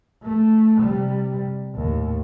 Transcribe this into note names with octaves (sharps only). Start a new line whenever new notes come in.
A3
C3 G3
D#2 A2